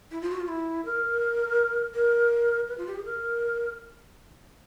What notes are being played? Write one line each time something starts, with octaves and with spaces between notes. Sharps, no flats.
E4
F4
F#4
F4
E4
A#4
A#4
B4
F4
G4
G#4
A#4